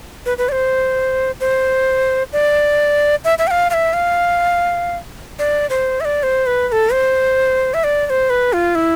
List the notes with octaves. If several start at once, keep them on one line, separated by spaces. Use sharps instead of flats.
B4
B4
D5
C5
C5
D5
E5
E5
G5
F5
F5
E5
F5
D5
C5
E5
D5
C5
B4
B4
A4
C5
E5
D5
D5
C5
B4
F4
E4